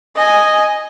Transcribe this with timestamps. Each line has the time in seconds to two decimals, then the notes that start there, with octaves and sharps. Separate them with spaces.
0.16 D#5 G#5